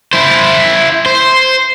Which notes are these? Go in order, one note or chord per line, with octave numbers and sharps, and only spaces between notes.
E4 C5
C5